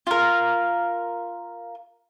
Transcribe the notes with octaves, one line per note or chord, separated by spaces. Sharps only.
F4 A#4